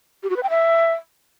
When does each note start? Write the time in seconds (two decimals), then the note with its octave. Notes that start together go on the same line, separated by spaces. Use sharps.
0.23 G4
0.30 F#4
0.36 B4
0.43 G5
0.50 E5